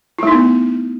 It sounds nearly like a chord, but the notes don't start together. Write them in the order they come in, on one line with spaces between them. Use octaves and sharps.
E4 A3 D#4 B3